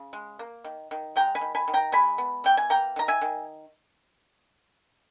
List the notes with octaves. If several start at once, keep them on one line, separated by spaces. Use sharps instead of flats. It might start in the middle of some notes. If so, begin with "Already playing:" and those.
Already playing: C#3
G#3
A#3
D#3
D#3
G#3 G5 A#5
G#5 B5
D#3
G#5 B5
D#3
G5 A#5
G#3 G#5 B5
B3
E3 G5
G#5
A#3 G5 A#5
D#3 A#5
E5 G#5
D#3